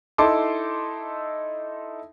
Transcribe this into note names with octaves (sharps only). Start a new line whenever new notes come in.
D#4 E4 A4 A5 C6 D6